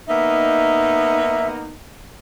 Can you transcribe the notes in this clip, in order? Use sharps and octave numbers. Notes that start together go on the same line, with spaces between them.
A#3 B3 D#4 E5